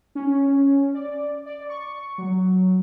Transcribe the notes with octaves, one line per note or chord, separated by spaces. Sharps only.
C#4
D5
D5
C#6
F#3